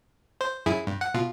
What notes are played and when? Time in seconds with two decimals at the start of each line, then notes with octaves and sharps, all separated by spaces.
0.41 C5
0.66 F#2 E4 G#4
0.87 G2
1.01 F#5
1.14 B2 F4